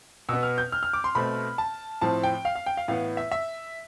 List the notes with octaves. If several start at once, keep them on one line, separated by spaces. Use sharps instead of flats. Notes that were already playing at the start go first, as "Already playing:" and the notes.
B2 B3 E6
F6
G6
F6
F6
D6
C6
B2 A3 C4 B5
A5
A2 F3 C4 A5
G5
F5
F5
G5
F5
A2 E3 B3 F5
E5
E5